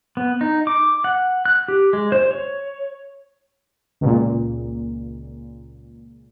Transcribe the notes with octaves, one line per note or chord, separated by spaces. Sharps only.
B3
D#4
D6
F#5
F#6
G4
G#3
C5
C#5
C#2 A#2